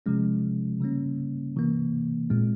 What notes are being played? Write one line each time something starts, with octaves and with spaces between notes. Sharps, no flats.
C3 F3 G#3 C#4
C#3 G3 A#3 C#4
C3 E3 A#3
A#2 G#3 C4